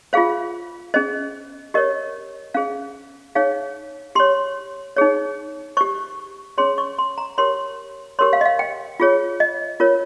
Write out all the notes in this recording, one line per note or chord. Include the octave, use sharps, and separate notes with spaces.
F4 G#4 C5 F5
C#4 G#4 C5 D#5
G4 A#4 C#5 D#5
C#4 G#4 C5 F5
D#4 G#4 C#5 F5
G4 C#5 C6
D#4 G#4 C#5
G4 C5 C#6
C#4 G#4 C#5 C6
C#6
C6
A#5
G4 A#4 C#5 C6
G4 A#4 C#5 C6
F5
D#5
F5
G5
F4 G#4 C#5
D#5
F4 A#4 C#5